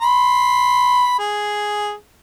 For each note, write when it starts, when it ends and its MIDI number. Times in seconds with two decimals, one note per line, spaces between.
0.02 1.15 83
0.02 1.15 84
1.20 1.93 68